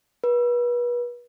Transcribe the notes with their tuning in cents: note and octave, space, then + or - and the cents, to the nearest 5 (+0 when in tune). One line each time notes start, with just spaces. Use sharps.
B4 -35